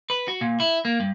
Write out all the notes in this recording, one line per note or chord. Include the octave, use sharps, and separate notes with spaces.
B4
F#4
A#2
E4
A#3
G2